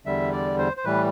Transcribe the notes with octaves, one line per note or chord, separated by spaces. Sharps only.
E2 D3 G3 E5
D5
C5
C5
A2 E3 G3 B4